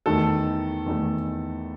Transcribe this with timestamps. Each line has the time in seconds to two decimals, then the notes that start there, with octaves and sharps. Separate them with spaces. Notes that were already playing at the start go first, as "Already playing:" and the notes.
0.06 E2 D#3 A3 A4
0.86 E2 D#3 A3